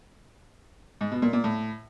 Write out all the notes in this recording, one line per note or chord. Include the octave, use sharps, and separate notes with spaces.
G#2
B2
A#2
A#2
A2